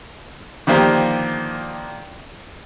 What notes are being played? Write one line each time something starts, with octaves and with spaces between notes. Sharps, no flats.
D3 D#3 F3 A#3 F4 G4